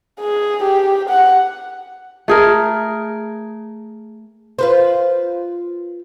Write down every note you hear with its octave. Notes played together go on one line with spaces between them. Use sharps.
G#4
G4
F#5
A3 G#4 A#4
F4 B4 C5